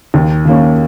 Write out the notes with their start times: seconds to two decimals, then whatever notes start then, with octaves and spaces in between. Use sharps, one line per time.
0.14 D#2
0.45 D#3 A#3 C#4